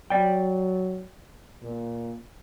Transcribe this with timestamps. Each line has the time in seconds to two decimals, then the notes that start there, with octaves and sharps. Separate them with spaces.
0.10 F#3 D5 G5
1.63 A#2